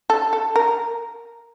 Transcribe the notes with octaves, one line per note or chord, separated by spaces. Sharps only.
A4
A4
A#4